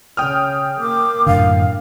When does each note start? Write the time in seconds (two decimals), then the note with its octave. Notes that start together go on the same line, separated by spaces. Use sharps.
0.17 C#3 G5 D#6 F6
0.81 A#3 D6
1.27 F#2 A2 D3 F5